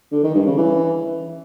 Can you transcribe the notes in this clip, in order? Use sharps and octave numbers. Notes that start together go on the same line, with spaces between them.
D3
D#3
G2
C#3
E3